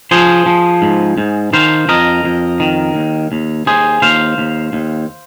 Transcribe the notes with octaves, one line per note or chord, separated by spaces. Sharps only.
F3 G#4 C5
F3
G#2
G#2
D#3 C5 F5
F2 A#4 D#5
F2
D#3
D#2
D#2
D#2 G#4 C5
D#2 C5 F5
D#2
D#2